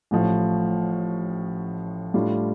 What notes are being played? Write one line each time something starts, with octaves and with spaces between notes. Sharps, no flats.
A1 A2 F3
A2 G3 D4 F4